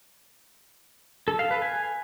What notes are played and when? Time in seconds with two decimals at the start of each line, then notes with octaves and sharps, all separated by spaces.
1.28 A4
1.39 F5
1.51 B4
1.62 G#5